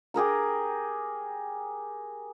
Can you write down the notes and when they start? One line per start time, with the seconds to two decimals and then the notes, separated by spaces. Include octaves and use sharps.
0.14 G4 G#4 A#4 A#5